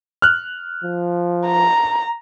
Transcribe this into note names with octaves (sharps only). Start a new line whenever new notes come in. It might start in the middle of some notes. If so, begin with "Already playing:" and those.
F6 F#6
F3
A#5